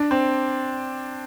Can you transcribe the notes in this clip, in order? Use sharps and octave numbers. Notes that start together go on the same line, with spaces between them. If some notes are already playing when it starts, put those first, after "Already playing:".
Already playing: D4
C4